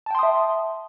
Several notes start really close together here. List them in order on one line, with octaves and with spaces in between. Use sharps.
A5 G5 C6 D#6 E5